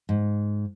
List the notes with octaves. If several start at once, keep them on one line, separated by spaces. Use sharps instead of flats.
G#2